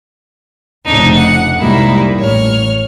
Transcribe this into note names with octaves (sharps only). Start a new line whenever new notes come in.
F1 F2 C#3 D4 D#4
F#5
C2 G3 G#3 A#3 D#4 E4
A1 C#5 F6